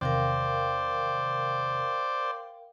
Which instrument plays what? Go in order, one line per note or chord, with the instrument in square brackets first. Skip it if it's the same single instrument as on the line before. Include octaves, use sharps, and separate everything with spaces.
[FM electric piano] E2 C3 D#3 [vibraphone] A#4 F5 G5 [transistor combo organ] C5 D5